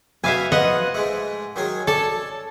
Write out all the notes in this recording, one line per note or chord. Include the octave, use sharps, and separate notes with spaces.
F#3 B3 E4 E5 F5 G#5
F3 B3 D#5 F#5 D#6
G#2 G#3 A3
D#3 F#3 G#4
A4 C#5 D5 A5